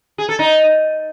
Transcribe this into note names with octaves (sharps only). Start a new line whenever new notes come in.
G#4
A4
D#4